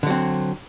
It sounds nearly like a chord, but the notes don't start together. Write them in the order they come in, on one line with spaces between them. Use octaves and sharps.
D3 F#3 C4